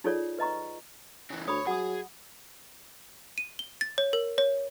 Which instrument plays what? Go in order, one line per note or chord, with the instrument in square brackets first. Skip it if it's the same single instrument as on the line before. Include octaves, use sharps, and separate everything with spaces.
[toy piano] D#4 F4 G#4 A4 C#5 D5
B4 D#5 A#5 C#6
[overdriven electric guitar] C#3 E3
[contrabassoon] D2 [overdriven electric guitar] C#5 [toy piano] B5 D#6
[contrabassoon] F#3 [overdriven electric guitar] G#4 [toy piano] F#5 D#6
[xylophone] D#7
G7
A6
C#5
A#4
C#5